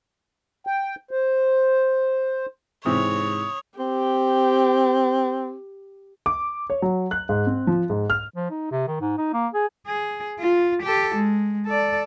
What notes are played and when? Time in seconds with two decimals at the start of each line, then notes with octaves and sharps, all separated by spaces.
0.67 G5
1.11 C5
2.86 G#2 C3 E3 C#5 D#6
3.79 C4 G4
6.26 D6
6.70 C#5
6.82 F#3
7.11 F#6
7.29 G#2
7.47 C4
7.67 F3
7.90 G#2
8.10 F6
8.35 F3
8.50 D#4
8.71 C3
8.87 D#3
9.01 G#2
9.18 D#4
9.33 A#3
9.54 G#4
9.87 G#4
10.39 F4
10.82 G4 A4
11.15 G#3
11.67 A4 D5